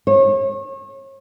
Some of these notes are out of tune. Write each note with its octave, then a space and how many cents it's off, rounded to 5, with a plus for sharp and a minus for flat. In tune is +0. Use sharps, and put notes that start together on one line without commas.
C#5 -35